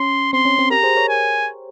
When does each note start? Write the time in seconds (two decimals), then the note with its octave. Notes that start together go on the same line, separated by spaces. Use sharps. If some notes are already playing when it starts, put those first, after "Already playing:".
Already playing: C#4 C6
0.33 C4 C6
0.45 C#4
0.59 C4
0.70 G4 A#4 A#5
0.83 G#4 C5
0.96 A#4 C#5
1.09 G#5